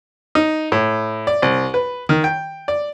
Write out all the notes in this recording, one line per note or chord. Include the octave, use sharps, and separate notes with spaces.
D#4
A2
D5
C2
B4
D#3
G5
D5